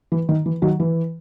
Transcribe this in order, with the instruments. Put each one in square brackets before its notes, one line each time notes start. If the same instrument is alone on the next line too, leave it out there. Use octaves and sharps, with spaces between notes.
[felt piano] E3
D#3
E3
D#3 F#3
E3